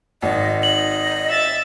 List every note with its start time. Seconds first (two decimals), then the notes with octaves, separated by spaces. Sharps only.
0.22 G#1 D#5
0.63 D#5 F#7
1.29 E5 A6